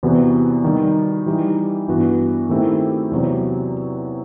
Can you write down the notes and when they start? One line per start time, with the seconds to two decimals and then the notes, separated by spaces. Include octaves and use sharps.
0.03 E2 C3 E3 B3 F#4
0.64 D#3 G3 D#4
1.26 E3 G3 D#4 G4
1.88 G2 E3 B3 F#4
2.49 D#3 A3 C4 E4 G4
3.11 E2 C3 F#3